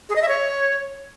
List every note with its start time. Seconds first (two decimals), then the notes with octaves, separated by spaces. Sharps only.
0.09 G#4
0.16 D#5
0.22 E5
0.28 C#5